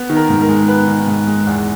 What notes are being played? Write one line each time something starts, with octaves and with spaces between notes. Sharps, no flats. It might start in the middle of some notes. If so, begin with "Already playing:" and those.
Already playing: B3
D#3
A#4
G#2
A#4
G#3
B3 B4
D#3
G#2
G#3
E2